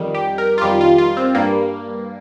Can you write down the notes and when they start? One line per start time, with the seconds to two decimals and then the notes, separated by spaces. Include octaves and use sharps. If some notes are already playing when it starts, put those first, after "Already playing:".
Already playing: F2 D#3 G3
0.15 G4
0.38 A#4
0.58 F4
0.62 F2 D#3 G3 G4
0.81 F4
0.98 F4
1.17 C4
1.35 G2 G3 A#3